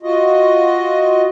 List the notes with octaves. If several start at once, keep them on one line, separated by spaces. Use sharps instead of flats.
F4 F#4 D#5